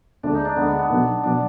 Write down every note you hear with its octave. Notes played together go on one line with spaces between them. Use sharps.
D2 D3 G#3 D4
D#4
D4
D2 D3 G#3 B3
B3
B3
B1 B2 F#3
B2 F#3 D4